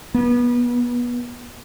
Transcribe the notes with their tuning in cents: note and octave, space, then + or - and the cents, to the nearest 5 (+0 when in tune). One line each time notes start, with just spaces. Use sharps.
B3 -25